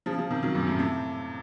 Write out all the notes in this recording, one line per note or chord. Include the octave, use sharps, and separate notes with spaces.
C#3 F3
C#3 F3
C3 D#3
D#3 F#3
F#2 A#2
A2 C3
A2 C3